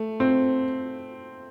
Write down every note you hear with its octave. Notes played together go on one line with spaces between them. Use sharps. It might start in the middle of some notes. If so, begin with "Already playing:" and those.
Already playing: A3
C4